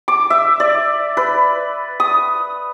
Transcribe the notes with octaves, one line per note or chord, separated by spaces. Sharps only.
D6
E5
D5
B4
D#6